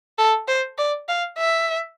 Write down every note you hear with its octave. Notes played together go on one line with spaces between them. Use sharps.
A4
C5
D5
F5
E5